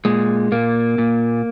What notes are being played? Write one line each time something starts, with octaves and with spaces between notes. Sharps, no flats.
A#2 G#3
A#2 A#3
A#2